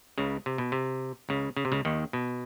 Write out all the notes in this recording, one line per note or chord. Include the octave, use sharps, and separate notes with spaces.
C#2 C#3
C3
B2
C3
C#2 C#3
C#3
C3
C#2 C#3
D#2 D#3
B2